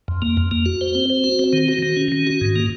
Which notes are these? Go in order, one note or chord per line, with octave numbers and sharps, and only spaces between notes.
F2
A#3
F2
A#3
F#4
C5
C4
C5
F#4
C4
D#3
F#4
D#3
C#4
D#3
F#4
G#2
A#3